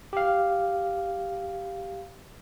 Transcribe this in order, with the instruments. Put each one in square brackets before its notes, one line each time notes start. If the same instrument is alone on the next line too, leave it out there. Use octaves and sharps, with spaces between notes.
[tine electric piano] G4 F5